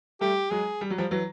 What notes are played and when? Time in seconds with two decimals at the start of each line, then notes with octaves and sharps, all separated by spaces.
0.21 G3 A3 G4
0.50 F#3 G#3 G#4
0.81 G3
0.90 F#3
0.98 F3 G3
1.11 E3 F#3